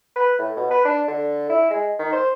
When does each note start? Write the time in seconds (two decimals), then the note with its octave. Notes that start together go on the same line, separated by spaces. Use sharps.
0.16 B4
0.39 A2
0.56 B2
0.71 B4
0.85 D4
1.08 D3
1.49 E4
1.70 G#3
1.99 D#3
2.12 C5